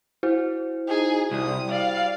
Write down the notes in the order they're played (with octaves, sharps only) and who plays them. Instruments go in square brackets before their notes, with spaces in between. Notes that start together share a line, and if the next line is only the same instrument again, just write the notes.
[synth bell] E4 F#4 C5
[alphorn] D#4 [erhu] G#4
[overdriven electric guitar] C2 [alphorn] G3 [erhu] D#6
[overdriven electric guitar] D5 [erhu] F5